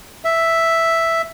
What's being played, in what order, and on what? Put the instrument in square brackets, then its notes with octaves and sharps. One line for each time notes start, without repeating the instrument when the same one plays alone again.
[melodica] E5